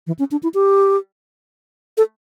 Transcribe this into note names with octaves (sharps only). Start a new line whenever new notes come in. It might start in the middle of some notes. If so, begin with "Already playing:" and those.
E3
C#4
D4
E4
G4
A4